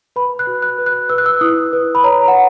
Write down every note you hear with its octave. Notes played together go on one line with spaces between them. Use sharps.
B4 B5
F#6
F#4
F#6
B4
F#6
B4 E6
F#6
E6
E4 D#6
B4
B5
C#5 A#5
F#5